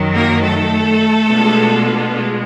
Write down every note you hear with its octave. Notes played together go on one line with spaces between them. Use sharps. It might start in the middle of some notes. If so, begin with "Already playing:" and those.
Already playing: F#2 D#3 F#3
A#3 A#4
A3 A4
B2 G#3 B3 D4 F4
G#3